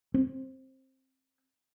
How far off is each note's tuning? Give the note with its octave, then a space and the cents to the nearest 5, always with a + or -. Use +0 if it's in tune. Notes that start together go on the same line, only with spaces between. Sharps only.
C4 +15